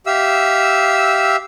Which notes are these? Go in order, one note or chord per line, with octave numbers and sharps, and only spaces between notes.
G4 E5 F5 E6